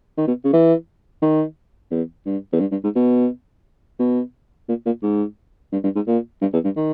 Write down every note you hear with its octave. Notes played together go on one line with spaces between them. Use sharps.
D#3
B2
C#3
E3
D#3
E2
G2
E2
G2
G2
G#2
B2
B2
A#2
A#2
G#2
G2
G2
G#2
A#2
G2
E2
G2
D#3